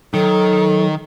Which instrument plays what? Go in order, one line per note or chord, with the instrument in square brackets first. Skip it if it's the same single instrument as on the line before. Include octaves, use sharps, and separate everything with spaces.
[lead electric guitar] D#3 [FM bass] F#3 [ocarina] A4